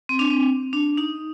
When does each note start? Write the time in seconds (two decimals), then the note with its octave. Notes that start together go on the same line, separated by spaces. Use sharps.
0.09 C4
0.19 D4
0.30 C4
0.73 D4
0.97 D#4